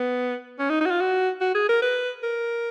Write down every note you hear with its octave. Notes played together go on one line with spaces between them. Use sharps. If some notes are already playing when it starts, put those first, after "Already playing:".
Already playing: B3
C#4
D#4
D#4
F#4
F4
F#4
F#4
G#4
A#4
B4
A#4